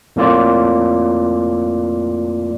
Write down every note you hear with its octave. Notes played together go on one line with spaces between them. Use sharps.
F2 A2 A#3 F4 D5